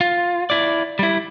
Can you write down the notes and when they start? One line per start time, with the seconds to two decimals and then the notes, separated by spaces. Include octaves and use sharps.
0.01 F4
0.50 E4 D5
0.99 G3 E4